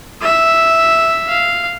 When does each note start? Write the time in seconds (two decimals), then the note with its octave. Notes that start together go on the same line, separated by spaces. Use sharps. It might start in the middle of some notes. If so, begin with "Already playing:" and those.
0.22 E5
1.29 F5